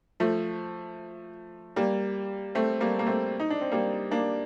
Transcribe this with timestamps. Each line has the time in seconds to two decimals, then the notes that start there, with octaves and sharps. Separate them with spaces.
0.20 F3 A3
1.76 G3 A#3
2.55 A3 C4
2.80 G3 A#3
2.99 A#3
3.07 A3 C4
3.40 D#4
3.50 D4
3.61 C4
3.72 G3 A#3
4.11 A#3 D4